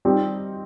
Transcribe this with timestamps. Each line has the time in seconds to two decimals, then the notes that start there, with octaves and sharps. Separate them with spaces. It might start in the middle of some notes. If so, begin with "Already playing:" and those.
0.05 G3 C4 D#4 G4